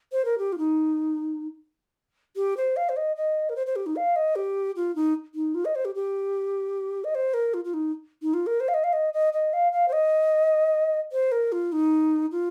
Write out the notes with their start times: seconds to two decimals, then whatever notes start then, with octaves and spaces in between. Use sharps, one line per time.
0.12 C5
0.24 A#4
0.38 G4
0.52 F4
0.58 D#4
2.36 G4
2.56 C5
2.76 F5
2.88 C5
2.96 D#5
3.16 D#5
3.49 A#4
3.55 C5
3.66 C5
3.75 G4
3.86 D#4
3.95 F5
4.15 D#5
4.35 G4
4.76 F4
4.95 D#4
5.34 D#4
5.54 F4
5.65 D#5
5.75 C5
5.84 G4
5.94 G4
7.04 D#5
7.14 C5
7.33 A#4
7.53 F4
7.64 F4
7.73 D#4
8.22 D#4
8.33 F4
8.46 A#4
8.60 C5
8.68 F5
8.73 D#5
8.83 F5
8.92 D#5
9.13 D#5
9.33 D#5
9.53 F5
9.72 F5
9.88 C5
9.92 D#5
11.12 C5
11.31 A#4
11.52 F4
11.72 D#4
12.31 F4